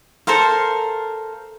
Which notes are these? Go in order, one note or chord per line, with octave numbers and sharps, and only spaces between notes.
A4 A#4 C5 F5